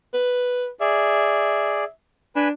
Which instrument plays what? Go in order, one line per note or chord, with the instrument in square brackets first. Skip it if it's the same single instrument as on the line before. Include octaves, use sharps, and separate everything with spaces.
[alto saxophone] B4
[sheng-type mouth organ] G#4 D5 [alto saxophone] E5
[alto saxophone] D4 [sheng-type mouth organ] B4 G#5 B5